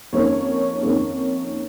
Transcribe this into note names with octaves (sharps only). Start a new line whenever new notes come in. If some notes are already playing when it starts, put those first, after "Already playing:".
F2 D#3 A#3 C#4 C#5
F2 D#3 A#3 C#4